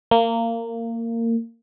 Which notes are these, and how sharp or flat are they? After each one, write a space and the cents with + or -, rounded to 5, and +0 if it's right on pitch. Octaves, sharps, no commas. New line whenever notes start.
A#3 -20